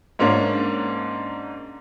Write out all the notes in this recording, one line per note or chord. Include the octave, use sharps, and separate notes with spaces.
G#2 A#3 C#4 D4